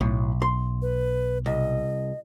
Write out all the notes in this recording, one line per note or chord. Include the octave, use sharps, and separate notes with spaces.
B1 A2
C6
B4
C2 D#5